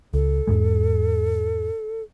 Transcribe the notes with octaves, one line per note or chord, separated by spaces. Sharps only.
C#2 A4
E2 G#2 G#3